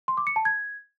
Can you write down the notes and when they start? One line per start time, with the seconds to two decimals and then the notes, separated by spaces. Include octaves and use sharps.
0.08 C6
0.17 D6
0.27 C#7
0.36 A5
0.45 G#6